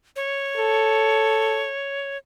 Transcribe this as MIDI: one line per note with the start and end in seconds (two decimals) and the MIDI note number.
0.16 2.17 73
0.57 1.69 69